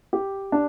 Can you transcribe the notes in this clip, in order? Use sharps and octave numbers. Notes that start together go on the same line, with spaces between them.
G4
D4